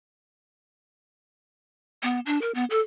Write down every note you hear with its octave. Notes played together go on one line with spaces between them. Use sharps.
B3
D4
A#4
B3
A4